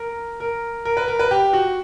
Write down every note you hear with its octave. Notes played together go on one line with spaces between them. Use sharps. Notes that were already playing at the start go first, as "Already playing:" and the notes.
Already playing: A#4
A#4
A#4
B4
A#4
B4
G4
F#4